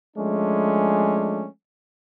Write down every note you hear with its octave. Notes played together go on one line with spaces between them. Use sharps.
F3 G#3 A3 C#4 D4